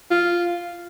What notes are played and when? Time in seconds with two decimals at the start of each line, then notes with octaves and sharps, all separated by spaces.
0.11 F4